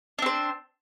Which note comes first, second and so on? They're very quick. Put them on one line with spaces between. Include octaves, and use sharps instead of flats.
D4 C4 C5